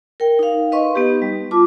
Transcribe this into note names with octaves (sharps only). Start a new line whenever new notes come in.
A#4 G5
D#4 F5
B4 D#5 F5 C6 C#6
B3 D#4 G4
G3
F4 A5 D6